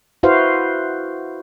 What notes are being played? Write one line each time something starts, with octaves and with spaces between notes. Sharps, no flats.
E4 F#4 B4 C5 F5